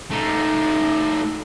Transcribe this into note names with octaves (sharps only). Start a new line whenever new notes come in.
A3 D#4